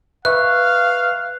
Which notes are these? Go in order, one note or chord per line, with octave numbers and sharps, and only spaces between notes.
B4 E5 F5 C#6 F#6